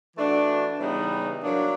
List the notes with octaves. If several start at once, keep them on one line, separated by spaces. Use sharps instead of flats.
E3 A3 D4 F#4
C#3 E3 G3 B3 D#4
F#3 A#3 D4